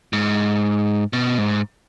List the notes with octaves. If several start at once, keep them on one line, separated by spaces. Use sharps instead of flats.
G#2
B2
G#2